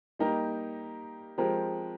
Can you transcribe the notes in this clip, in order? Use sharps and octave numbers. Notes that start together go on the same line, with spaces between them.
G3 A#3 D#4 G4 A#4
F3 G#3 C4 G4 A#4